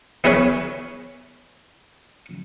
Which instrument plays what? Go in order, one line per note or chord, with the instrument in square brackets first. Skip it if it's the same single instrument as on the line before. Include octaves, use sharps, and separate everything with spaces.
[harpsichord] B3 E4 G#4 A#4 B4 C#5